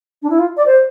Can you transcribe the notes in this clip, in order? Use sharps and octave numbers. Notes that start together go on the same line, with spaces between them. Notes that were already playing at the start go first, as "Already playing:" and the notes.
D4
E4
F4
D5
C5